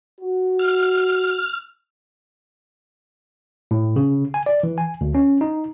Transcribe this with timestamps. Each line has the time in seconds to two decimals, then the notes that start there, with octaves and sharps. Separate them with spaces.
0.21 F#4
0.59 F6
3.71 A2
3.96 C#3
4.34 G#5
4.46 D5
4.63 E3
4.78 G#5
5.01 D2
5.15 C#4
5.41 D#4